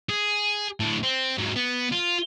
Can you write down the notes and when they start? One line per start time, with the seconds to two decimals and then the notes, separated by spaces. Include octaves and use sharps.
0.09 G#4
0.80 A2 D4
1.03 C4
1.37 G#2 F#3
1.56 B3
1.92 F4